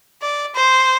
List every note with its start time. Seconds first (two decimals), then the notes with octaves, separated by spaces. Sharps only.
0.22 D5
0.55 C5